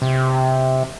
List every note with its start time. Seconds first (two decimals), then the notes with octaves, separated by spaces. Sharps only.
0.02 C3